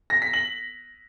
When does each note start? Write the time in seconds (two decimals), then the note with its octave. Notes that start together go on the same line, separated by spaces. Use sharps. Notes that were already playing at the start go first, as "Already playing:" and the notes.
0.10 A#6
0.22 B6
0.34 F#7